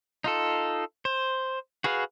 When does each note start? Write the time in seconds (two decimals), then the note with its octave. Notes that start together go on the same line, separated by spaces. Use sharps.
0.24 D#4 F4 A4
1.05 C5
1.84 F#4 G#4 B4 F5